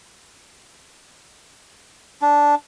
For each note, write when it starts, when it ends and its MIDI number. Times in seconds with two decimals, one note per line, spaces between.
2.22 2.55 62